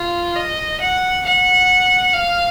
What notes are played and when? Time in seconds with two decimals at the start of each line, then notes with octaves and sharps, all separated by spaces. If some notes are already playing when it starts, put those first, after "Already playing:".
Already playing: F4
0.36 D#5
0.81 F#5
1.25 F#5
2.14 F5